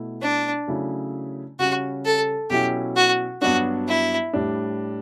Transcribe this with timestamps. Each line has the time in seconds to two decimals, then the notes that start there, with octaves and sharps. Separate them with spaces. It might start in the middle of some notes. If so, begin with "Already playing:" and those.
Already playing: B2 A3 E4
0.22 D4
0.68 C#3 F#3 A3 C#4 E4
1.59 C#3 G3 C#4 F#4
2.05 A4
2.50 B2 F#3 C#4 E4 G4
2.96 F#4
3.42 G2 F#3 B3 D4 F#4
3.88 E4
4.33 A2 G3 D4